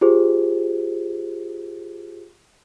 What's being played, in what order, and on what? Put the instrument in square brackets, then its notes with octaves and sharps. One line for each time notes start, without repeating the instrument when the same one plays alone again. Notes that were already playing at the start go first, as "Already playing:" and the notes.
[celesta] F4 G4 G#4 C5